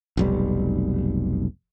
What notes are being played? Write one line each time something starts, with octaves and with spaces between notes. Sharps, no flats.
F1 B1 G3